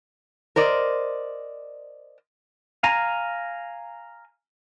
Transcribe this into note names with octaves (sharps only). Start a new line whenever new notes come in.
A#4 C5 D5 D#5
F5 G#5 A#5